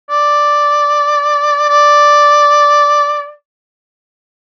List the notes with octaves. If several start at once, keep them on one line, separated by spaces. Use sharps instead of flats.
D5
D5